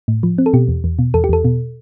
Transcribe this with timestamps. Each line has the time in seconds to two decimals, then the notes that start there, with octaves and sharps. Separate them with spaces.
0.08 A2
0.23 F3
0.38 C4
0.46 A4
0.54 B2 G4
0.68 E2
0.84 E2
0.99 B2
1.14 E2 A4
1.24 G4
1.29 E2 A4
1.44 B2